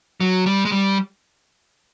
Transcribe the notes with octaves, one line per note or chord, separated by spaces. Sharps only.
F#3
G3
G#3
G3